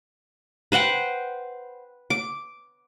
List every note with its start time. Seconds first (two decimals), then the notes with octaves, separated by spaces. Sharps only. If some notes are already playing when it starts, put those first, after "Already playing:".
0.72 B4 C5 F#5 G5
2.10 D6